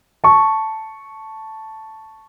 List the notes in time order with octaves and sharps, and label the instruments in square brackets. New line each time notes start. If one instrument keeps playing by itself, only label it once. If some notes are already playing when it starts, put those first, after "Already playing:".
[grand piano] A5 C#6